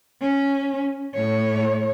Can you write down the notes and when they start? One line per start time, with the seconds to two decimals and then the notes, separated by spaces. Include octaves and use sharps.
0.21 C#4
1.15 A2 C#5